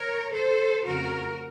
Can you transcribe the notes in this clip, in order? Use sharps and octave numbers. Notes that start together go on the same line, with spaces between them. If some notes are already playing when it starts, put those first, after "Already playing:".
Already playing: A#4 C#5
A4 C5
F2 C#3 A3 C4 F#4 A#4